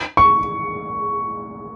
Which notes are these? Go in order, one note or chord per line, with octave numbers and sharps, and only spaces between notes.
C#6